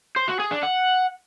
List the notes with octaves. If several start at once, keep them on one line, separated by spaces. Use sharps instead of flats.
C5
F#4
G#4
D4
F#5